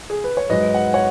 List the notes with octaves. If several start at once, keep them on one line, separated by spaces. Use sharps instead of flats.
G#4
B4
C#5
G#2 F#3 B4 D#5
F#5
C#5 F#5